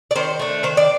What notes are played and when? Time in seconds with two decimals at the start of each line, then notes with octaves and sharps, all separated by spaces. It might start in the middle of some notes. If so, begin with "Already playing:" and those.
0.11 D5
0.15 D#3 C5
0.39 A3 D4
0.63 D#3 C5
0.77 D5